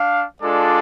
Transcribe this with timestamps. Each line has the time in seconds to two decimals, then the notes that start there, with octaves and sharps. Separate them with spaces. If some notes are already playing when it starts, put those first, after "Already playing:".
Already playing: D4 F5
0.42 G#3 D4 F4 A4 D5